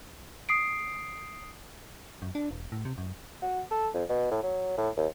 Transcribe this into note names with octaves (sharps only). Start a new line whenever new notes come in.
D#6 C7 D7
F#2
D4
E1
A2
C3
F#2
F#4
A4
F2
B2
A2
F#3
A2
D#2